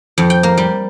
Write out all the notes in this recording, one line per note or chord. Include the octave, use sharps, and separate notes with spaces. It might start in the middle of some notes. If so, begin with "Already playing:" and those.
F2
G5
A#3
G3